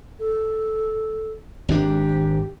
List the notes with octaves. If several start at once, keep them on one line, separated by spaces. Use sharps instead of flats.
A4
G#1 G#2 D4 G4